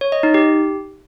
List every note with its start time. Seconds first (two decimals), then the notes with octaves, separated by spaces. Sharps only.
0.01 C#5
0.12 D#5
0.23 D#4
0.34 G4